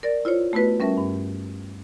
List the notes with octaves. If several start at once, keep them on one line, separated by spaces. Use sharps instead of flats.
A#4 D5 A6
E4 F4 C5 C#5
A3 B3 E4 F#4 B4 D#5
G3 C#4 A#4 E5 A5
G2